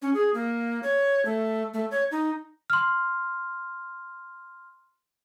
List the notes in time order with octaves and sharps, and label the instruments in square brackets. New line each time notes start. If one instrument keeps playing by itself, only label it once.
[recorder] C#4
G#4
A#3
C#5
A3
A3
C#5
D#4
[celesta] C6 F6